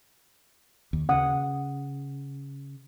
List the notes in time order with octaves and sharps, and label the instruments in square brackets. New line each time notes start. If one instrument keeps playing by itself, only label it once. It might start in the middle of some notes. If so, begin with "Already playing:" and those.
[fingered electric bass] D#2
[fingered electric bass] C#3 [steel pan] F#5 D#6